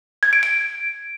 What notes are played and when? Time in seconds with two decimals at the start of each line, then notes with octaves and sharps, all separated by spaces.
0.23 G#6
0.33 D7
0.43 D7